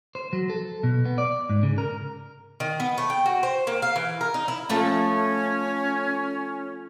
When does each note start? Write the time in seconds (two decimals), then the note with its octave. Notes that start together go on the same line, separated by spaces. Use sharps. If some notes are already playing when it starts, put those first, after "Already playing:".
0.15 C5
0.33 F#3
0.50 A4
0.83 B2
1.05 B3
1.18 D5
1.50 G#2
1.63 C#3
1.78 A#4
2.60 D#3
2.80 B3
2.98 A3
3.10 G5
3.26 F#4
3.43 C5
3.67 A#3
3.82 F5
3.96 E3
4.21 A#4
4.34 D#4
4.48 E4
4.69 F3 A3 C#4 E5